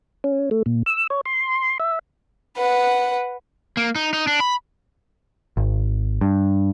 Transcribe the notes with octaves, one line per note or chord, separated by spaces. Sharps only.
C#4
A3
A#2
E6
C#5
C6
E5
B4 F#5
A#3
D#4
D#4
D4
B5
G#1
G2